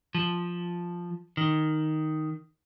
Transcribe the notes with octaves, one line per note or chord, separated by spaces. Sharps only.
F3
D#3